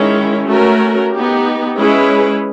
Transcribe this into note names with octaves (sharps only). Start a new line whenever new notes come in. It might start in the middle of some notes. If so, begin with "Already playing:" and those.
Already playing: D#3 G#3 C#4 E4
A3 C#4 F#4 A#4
B3 D#4 G4
G#3 C#4 E4 G#4 B4